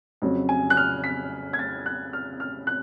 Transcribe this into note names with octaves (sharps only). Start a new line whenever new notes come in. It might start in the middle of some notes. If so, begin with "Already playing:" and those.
F2 C#3 F#3
G#5
F#6
F6
B6
G#6
A6
F#6
F6
F6
F#6